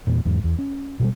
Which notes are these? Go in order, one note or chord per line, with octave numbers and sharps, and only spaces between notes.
E2 A#2
E2 G#2
E2
C#4
B2 F3 G3